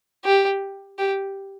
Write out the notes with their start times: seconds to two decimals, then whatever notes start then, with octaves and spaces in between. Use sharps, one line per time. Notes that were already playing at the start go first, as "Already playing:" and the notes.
0.25 G4
0.99 G4